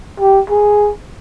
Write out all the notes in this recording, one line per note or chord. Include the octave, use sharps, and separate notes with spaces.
G4
G#4